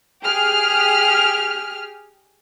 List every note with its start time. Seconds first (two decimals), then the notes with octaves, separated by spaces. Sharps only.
0.23 G4 G#4 F6